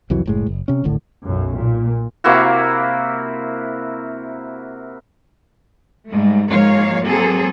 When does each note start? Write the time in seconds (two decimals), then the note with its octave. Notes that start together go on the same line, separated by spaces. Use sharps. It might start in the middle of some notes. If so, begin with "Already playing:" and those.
0.10 C2 F2 E3 F#3
0.26 F#1 A2 G#3
0.47 F#1
0.68 C3 C#4
0.84 D1 G#1 A2 D3
1.25 B1 F#2
1.56 A#2
2.24 C3 A#3 E4 F#4
6.10 G#2 G3 A3
6.50 G#2 F3 G#3 A#3 C#5 F5
7.03 F#3 A#3 C4 G#4 A4